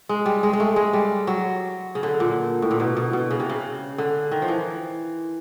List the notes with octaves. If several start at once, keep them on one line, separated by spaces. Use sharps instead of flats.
G#3
G3
G#3
G#3
A3
G#3
G3
F#3
C#3
D3
A#2
A2
A#2
B2
B2
B2
C#3
C3
C#3
D3
D#3
F3
E3